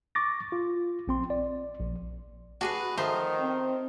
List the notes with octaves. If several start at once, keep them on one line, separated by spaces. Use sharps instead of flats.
C#6 D6 A6 A#6
F4
A#1 C4 C6
D5
A#1
D4 F#4 G#4 B4
D#3 F3 A3 C5 A#5 D#6
C4